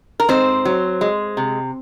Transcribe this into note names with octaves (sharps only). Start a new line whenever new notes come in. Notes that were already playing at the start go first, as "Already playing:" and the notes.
A#4
G#2 C4 C5
F#3
G#3
C3